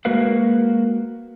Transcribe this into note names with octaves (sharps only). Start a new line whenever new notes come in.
G#3 A#3 F#4 A#4 B4 F5